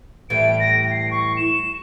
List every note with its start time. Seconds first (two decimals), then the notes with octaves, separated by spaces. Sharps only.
0.30 A2 E3 G3 D7
0.60 A#6
0.91 C7
1.11 C#6
1.37 E7